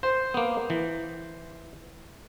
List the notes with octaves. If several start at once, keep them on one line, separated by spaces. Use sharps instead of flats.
C5
A#3 B3
E3